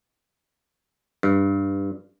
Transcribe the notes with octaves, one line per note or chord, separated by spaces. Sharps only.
G2